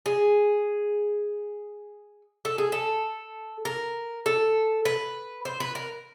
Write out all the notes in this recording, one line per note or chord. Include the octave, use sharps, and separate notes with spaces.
G#4
A4
G#4
A4
A#4
A4
B4
C5
B4
A#4